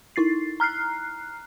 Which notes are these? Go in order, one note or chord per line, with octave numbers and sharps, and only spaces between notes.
D#4 E4 A6 C7
A#5 F6 F#6 C7